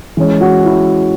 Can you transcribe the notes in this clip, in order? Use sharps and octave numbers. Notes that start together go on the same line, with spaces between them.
E3 G#3 C#4
F#4
E4